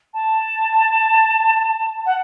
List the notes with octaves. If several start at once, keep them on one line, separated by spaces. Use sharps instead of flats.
A5
F#5